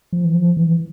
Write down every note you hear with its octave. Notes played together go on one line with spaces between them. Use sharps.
F3
E3
F3
E3